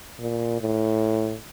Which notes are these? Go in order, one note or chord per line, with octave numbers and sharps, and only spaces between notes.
A#2
A2